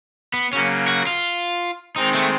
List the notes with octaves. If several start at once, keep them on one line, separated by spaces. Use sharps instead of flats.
B3
C#3 F#3 A#3 C#4
F#4
F4
D#3 G#3 C4 D#4
A3